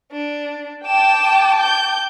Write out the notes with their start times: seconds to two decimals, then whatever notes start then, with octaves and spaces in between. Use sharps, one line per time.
0.12 D4
0.87 G5 A5 D6 E7
1.61 G6